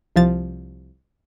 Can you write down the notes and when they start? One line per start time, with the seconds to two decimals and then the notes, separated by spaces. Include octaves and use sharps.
0.16 C2 F3 A6